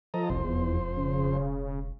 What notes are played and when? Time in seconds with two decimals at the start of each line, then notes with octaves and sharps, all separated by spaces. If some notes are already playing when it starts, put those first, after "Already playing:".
0.14 F3 A4 D#5 A#5
0.30 F#1 C2 F2 C5
0.44 E1 E2
0.97 C#3